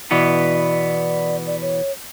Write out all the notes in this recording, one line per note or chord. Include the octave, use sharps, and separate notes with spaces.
B2 E3 B3 D5
D5
C#5